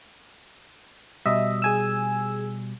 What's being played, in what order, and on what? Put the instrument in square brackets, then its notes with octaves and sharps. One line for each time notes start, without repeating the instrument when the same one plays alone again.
[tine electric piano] B2 G3 [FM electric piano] D#5 E5
[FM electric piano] G#4 G#5 E6